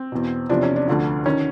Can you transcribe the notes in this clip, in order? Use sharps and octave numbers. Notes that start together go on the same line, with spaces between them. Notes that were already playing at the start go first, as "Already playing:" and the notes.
Already playing: C4
E2 B2
E2 C3 F3 D4
C#4
D4
D2 D3 F3
D#3 C#4